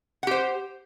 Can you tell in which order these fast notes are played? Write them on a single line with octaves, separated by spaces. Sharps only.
F#5 G4 C5